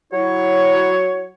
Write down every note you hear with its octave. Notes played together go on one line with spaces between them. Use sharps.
F#3 E4 C#5